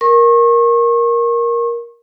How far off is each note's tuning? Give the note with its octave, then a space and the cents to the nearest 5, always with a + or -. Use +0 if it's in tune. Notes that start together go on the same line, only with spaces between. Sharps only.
A#4 +10 C#6 -35